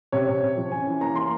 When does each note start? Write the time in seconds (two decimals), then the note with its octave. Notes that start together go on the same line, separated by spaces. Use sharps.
0.12 C3 C#5
0.28 C3
0.43 C3
0.57 F3
0.71 C#4 G#5
0.87 E3
1.01 A#3 A#5
1.16 A#3 C6